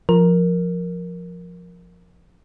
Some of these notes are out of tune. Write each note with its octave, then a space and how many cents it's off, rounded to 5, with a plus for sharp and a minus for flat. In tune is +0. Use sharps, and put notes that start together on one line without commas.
F3 +0 A#4 +0